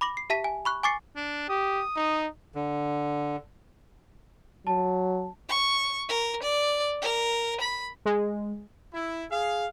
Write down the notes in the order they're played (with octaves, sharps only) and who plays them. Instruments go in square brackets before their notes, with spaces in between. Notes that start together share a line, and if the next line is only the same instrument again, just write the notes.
[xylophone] B5 D6 A#6 F#7
C7
G4 E5 A5 B6 D#7
G#5
B5 C#6 F#6
G#5 C#6 D6 A6 C7 C#7
[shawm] D4
[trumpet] G4 [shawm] D#6
[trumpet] D#4
[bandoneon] D3
[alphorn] F#3 [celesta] A5
[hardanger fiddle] C#6
A#4
D5
A#4
B5
[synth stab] G#3
[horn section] E4
G#4 F5